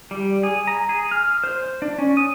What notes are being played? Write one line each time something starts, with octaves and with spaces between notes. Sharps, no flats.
G3
G#4
A#5
G#4
F6
C5
D4
C#4
D#6